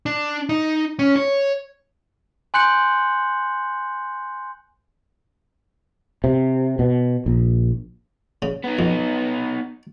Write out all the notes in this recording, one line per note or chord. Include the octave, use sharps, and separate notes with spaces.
D4
D#4
C#4
C#5
G#5 C6 F#6 G6 C#7 F#7
C3
B2
A#1
C#3
B3 D#4
F2